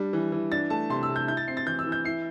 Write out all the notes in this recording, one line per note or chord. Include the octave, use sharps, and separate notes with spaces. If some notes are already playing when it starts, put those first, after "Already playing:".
Already playing: G3 D4
E3
E3
D4 A6
A3 A5
C3 C6
E6
C3
G6
E4 G6
A6
C4 C7
A6
E3 G6
E6
E3
G6
E4 C7